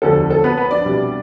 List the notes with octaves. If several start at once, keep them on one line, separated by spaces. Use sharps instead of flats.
E1 D2 D3 F3 A4
A4
B3 B4
B3 B4
D4 D5
C2 B2 G3